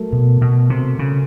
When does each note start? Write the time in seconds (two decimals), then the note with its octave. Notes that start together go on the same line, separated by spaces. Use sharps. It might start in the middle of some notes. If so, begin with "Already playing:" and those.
Already playing: F#3 A3 A#4
0.13 B2
0.41 B2
0.70 C3
0.99 C#3